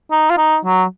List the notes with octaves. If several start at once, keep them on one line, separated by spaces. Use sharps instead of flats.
D#4
F4
D#4
F#3